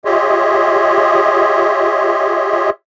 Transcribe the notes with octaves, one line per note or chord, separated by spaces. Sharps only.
F4 G4 G#4 C#5 D#5 E5